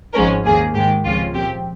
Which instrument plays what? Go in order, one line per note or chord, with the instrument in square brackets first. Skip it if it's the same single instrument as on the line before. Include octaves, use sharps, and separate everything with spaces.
[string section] G#1 G#2 F3 G#3 C#4 A#4
D#2 D#3 A#3 G#4
G#2 D#3 G#3 G4
C#2 C3 F3 G#3 C#4 F4
A#2 F3 C4 G4